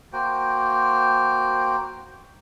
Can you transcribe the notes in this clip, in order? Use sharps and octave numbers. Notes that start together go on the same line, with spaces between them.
A#3 F#4 C5 G5